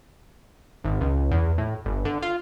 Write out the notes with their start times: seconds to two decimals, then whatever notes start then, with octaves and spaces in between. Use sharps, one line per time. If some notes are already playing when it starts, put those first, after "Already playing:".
0.84 G#1
1.01 C#2
1.31 E2
1.58 A2
1.85 G1
2.05 D3
2.22 F4